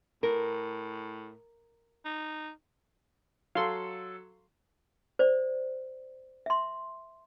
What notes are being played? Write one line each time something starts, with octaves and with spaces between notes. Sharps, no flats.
A2 A#4
D#4
F#3 A4 F5 C6
C5 D5
E5 C6